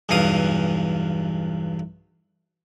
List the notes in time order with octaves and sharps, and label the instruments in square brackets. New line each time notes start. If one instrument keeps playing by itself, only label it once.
[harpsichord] B1 E2 G2 E3 F5 D#6